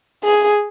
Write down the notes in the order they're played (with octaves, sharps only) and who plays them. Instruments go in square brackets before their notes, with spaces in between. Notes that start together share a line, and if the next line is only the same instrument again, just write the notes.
[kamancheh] G#4